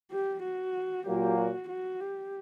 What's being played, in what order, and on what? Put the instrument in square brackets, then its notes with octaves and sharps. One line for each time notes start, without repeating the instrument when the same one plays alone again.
[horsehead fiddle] G4
F#4
[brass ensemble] A#2 F#3 A#3 [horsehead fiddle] G4
[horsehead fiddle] F#4
F#4
G4